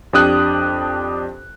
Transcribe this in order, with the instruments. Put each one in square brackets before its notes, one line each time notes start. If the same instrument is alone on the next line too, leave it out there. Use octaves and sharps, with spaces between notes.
[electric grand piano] F2 D4 G4 D#6 F#6